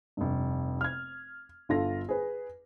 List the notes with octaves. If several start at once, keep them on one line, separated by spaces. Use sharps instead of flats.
F1 G2
F6 G#6
G1 D3 F4 A4 F5 A#6
G#4 B4